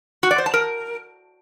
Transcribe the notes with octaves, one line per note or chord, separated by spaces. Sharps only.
F#4
D5
C5
A5
A#4